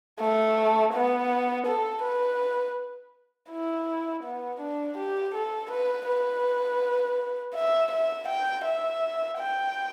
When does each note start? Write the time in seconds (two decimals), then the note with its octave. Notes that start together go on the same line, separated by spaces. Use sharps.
0.19 A3
0.93 B3
1.67 A4
2.03 B4
3.50 E4
4.23 B3
4.60 D4
4.98 G4
5.35 A4
5.71 B4
6.08 B4
7.55 E5
7.92 E5
8.28 G5
8.65 E5
9.38 G5